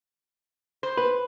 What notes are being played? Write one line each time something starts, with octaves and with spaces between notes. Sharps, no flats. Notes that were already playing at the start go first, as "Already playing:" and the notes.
C5
B4